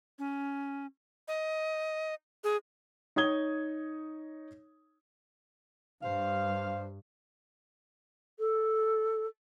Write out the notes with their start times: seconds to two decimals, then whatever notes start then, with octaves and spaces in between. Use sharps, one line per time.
0.19 C#4
1.28 D#5
2.44 G#4
3.16 D#4 C#5 D#6 G#6 G7
6.03 G2 C5 F5
8.39 A4